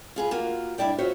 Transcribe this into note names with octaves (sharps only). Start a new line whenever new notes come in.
F4 G#4 B4
A#3 F4 F#4
G2 E4 D5 G5
F4 F#4 C5 C#5 E5